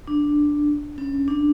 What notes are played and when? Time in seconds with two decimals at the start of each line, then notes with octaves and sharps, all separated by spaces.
0.07 D4
0.98 C#4
1.28 D4